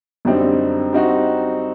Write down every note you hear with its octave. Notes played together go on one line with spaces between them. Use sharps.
F#2 D3 G3 C4 D#4
G3 C4 D#4 F#4